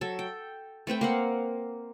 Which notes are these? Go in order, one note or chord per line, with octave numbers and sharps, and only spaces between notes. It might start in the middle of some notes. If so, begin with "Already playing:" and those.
F#3 A4
G5
A3 C4 B4 G5
A#3 F5 F#5